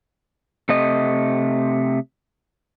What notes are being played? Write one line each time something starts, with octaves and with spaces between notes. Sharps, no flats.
C3 A3 D#5